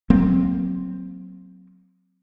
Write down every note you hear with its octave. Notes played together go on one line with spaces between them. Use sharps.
F#3 A#3 C4